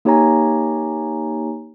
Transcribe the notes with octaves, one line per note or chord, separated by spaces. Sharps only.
A#3 D#4 G4 C#5 G#5 A#5